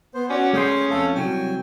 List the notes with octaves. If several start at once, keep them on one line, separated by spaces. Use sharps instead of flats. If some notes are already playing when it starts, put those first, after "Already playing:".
B3 C5
C#4 F#4 D5
A3 G#4 G5 G#5 C6
F2 A3 A4 F5
C2 F#3 G5 G#5